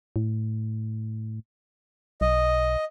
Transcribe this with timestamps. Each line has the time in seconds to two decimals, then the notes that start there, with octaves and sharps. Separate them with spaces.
0.16 A2
2.21 B1 D#5